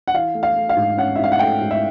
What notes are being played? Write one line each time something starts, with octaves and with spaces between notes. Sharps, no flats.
F#5
E3 F5
A3
F5
A3
F5
G#2
C#4 F#5
E5
G#2 F5
F#5
A3 G5
G#2
E5